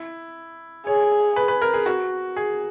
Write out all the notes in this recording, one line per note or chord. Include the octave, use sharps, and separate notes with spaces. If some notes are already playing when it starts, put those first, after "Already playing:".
Already playing: E4
G#4 C#5
B4
B4
A#4
G#4
F#4
G#4